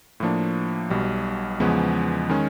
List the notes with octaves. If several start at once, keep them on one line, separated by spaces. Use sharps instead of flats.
A2 F3 A#3 D4
B1 B2 G3
E2 C#3 F3 G#3 B3
D#3 G#3 C#4